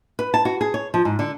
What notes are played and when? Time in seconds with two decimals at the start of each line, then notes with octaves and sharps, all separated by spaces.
0.19 B4
0.34 A5
0.45 F#4
0.61 G#4
0.74 C#5
0.94 F3
1.05 G#2
1.19 D3